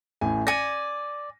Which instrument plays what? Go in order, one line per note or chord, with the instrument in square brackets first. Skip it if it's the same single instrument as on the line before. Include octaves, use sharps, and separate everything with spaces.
[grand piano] A1 A2 G#5
[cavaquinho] D5 G#5 [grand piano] A#6 C#7 D#7